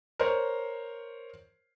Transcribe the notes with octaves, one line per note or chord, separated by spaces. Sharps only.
A#4 C5 C#5